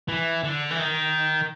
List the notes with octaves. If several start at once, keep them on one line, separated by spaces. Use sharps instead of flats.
E3
D3
E3
D#3